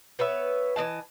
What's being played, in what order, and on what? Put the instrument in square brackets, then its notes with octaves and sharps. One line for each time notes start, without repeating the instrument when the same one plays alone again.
[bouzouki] B3 B4 C#5 E5
E3 D4 D#5 A5